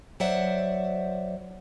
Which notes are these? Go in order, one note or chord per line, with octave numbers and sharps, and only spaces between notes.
F#3 C5 D5 E5 F#5